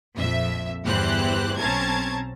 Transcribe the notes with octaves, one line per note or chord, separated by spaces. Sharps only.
A#1 F2 E5
G1 E2 E3 G4 C5 F#6
B1 C4 C#4 A5 A#5 G#6